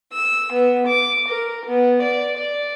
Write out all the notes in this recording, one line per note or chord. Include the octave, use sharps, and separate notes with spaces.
E6
B3
D6
A#4
B3
D5
D5